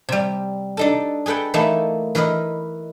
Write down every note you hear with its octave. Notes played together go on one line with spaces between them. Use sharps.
C3 G3
D4 D#4 A4
G#4 A4 B4 F#5 G5
E3 A3 A#3 D#4 E4 A4
E3 A#4 B4 D#5